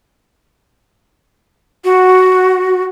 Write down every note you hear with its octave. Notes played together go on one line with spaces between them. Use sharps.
F#4